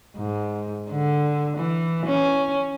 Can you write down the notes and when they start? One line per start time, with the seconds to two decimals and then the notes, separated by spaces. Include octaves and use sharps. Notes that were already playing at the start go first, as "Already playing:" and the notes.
0.17 G#2
0.91 D3
1.57 E3
2.06 C#4